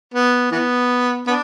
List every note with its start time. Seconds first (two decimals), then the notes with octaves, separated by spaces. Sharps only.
0.14 B3
0.51 E3 B3
1.27 B3 D4